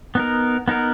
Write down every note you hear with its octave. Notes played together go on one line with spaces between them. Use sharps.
B3 D#4 A#4
B3 D#4 A#4